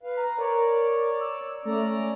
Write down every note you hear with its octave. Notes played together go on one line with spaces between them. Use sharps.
B4 F5
A#5
A#4 C#5 D5
E6
A3 C#4 D5 A#5